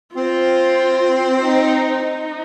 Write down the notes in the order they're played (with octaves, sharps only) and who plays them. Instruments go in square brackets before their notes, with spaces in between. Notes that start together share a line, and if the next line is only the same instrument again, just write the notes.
[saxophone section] C4 [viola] F4
[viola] D#4
D#4